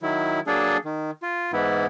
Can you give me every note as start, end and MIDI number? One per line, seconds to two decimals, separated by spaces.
0.02 0.40 51
0.02 0.40 54
0.02 0.40 64
0.47 0.77 54
0.47 0.77 58
0.47 0.77 62
0.47 0.77 68
0.47 0.77 69
0.85 1.11 51
1.22 1.51 65
1.53 1.86 44
1.53 1.86 52
1.53 1.86 59
1.53 1.86 64